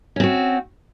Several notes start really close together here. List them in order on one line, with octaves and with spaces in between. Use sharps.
C#4 C4 F#4